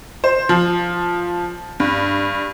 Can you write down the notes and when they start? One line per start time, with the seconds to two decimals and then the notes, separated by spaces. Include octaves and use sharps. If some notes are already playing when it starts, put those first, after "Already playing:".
0.24 C5
0.49 F3
1.80 G2